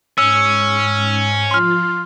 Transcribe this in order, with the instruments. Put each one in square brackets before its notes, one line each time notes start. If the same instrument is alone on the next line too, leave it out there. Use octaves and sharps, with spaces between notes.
[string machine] G#2 [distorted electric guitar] C#4 [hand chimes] E6
[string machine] F3 F4 [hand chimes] C6 F6